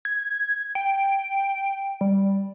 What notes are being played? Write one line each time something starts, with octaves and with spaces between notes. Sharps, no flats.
G#6
G5
G3